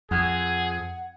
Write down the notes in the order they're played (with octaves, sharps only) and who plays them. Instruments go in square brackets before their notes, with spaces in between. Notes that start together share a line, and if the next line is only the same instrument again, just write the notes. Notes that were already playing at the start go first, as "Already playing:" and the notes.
[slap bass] F2 [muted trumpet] G#4 [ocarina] F#5